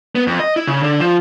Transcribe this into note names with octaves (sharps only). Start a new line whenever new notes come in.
B3
F2
D#5
E4
C#3
D3
F3